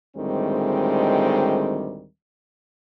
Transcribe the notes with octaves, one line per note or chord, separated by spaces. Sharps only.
D2 A2 D#3 G3 G#3 C4